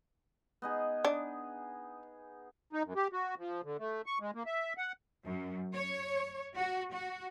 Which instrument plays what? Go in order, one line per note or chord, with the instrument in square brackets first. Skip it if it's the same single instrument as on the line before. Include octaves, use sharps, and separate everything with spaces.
[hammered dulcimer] B3 D#4 G#4
[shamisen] D4
[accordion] D#4
F#2
G4
F#4
F3
D3
A3
C#6
G#3
A#3
E5
F#5
[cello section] F#2
C#5
F#4
F#4